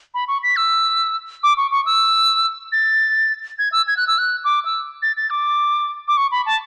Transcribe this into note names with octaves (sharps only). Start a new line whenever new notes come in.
B5
C#6
B6
E6
D6
C#6
C#6
E6
A6
G#6
E6
G#6
F#6
E6
F#6
D6
E6
A6
A6
D6
D6
C#6
B5
A5